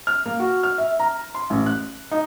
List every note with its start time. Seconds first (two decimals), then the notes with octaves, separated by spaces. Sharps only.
0.07 F6
0.26 A#3
0.40 F#4
0.63 F6
0.78 E5
1.00 A#5
1.35 C6
1.50 A1
1.66 F#6
2.11 D#4